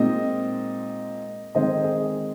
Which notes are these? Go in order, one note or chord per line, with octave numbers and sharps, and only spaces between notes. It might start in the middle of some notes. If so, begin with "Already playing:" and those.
Already playing: A#2 G#3 C4 D#4 D#5
D#3 G#3 C4 C5 D#5
G#4